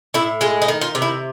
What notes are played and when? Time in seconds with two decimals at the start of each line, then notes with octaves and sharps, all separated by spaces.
0.14 A2 E4
0.41 G#3 F4
0.62 D#4
0.68 D#3
0.81 F4
0.95 C3
1.02 E4